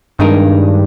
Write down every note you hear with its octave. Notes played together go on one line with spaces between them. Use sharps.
G2 D#3 G#3 D#4 A#4